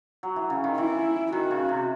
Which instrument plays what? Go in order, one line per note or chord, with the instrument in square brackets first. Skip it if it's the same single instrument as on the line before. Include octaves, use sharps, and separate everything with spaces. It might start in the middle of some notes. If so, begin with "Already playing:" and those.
[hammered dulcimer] F#3
E3
C#3
D#3
[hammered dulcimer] E3 [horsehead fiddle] E4
[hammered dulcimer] D#3 [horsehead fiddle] F#4
[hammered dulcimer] C#3
C3